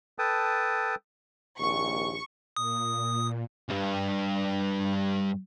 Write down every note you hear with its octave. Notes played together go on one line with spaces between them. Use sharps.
A4 B4 G5 A5 D#6
A#1 D#2 C3 C#6
A#2 D#6
C#2 G2